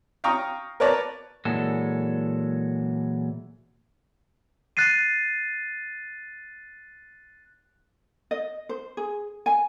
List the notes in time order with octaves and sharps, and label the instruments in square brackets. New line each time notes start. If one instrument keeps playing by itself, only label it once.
[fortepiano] F5 G5 A#5 C#6 D#6
A#4 B4 C#5 D5 A5 A#5
[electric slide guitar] A#2 E3 F#3 G#3 A4
[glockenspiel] F#6 A6 C7 D#7
[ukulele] D#5
C5
G#4
G#5